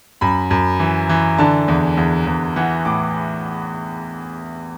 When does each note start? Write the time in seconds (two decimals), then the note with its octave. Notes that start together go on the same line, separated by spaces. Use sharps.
0.21 F#2 B5
0.51 F#2
0.80 E3
1.09 E3
1.38 D3 A5
1.68 E2
1.97 E2
2.27 E2
2.56 E3 F#5
2.85 A2 D6